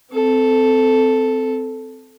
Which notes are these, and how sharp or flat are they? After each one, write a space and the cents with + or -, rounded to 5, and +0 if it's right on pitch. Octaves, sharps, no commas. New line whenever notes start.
C4 -20 A4 +0